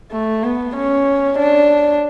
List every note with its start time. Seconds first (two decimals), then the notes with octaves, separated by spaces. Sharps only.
0.12 A3
0.44 B3
0.76 C#4
1.39 D4